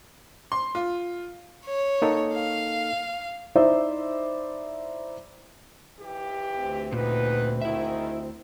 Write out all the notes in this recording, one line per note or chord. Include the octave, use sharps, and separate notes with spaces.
C6
F4
C#5
A#3 D#4 A4
F5
D#4 E4 C5 D5 E5
D#2 E3 G4
D2 C4
E2 A#2 D#4 B4
G#2 D#3 E4 E5